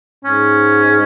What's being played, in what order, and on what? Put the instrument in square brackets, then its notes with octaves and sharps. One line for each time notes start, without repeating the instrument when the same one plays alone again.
[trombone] G#2 [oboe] C#4